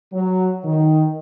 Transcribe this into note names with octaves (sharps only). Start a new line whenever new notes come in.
F#3
D#3